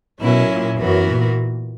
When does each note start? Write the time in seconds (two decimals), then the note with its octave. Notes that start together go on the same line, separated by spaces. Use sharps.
0.19 B2 F#3 C#4 E4 A#4
0.49 A#2
0.78 F#2 E3 B3 F#4 A#4
1.08 A#2